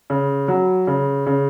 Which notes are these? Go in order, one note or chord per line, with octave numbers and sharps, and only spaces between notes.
C#3
F#3
C#3
C#3